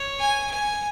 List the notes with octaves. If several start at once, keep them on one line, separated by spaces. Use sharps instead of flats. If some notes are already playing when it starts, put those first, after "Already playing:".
Already playing: C#5
G#5
G#5